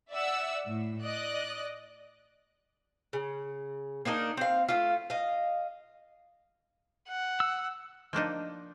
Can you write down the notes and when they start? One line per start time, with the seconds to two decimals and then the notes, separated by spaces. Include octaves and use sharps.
0.12 D5 E5 F#5 E6
0.67 A2
1.02 D5 D#5 F#6
3.13 C#3
4.05 A#3 D4 D#4 A#4
4.37 C4 F5
4.68 A3 F4
5.10 D#5 F5
7.08 F#5
7.40 E6
8.13 F3 A#3 D4 D#4